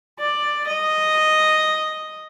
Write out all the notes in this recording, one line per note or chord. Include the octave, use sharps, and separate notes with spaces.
D5
D#5